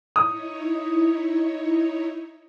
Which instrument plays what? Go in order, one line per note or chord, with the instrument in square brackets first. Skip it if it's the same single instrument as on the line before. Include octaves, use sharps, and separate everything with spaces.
[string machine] D#4 E4 C#5 [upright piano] D#6